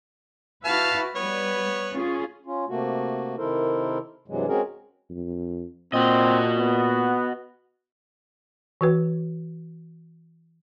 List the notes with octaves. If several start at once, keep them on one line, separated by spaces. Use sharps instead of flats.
E4 F#4 B4 F5 A5 F6
G3 B3 B4 C#5
C#4 F4 G#4
C#4 F4
C3 A3 A#3 F#4
C3 D#3 E4 A4 A#4 C5
G2 C3 E3 F#3 G#3
G#3 C4 C#4 F#4 G#4 A#4
F2
A#2 C4 F#4 D#5
B3
E3 F#4 B4